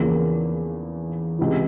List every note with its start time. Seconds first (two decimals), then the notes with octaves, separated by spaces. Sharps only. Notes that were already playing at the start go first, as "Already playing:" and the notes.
Already playing: E2 C#3 F3 A#3 C#4
1.39 C#2 C3 E3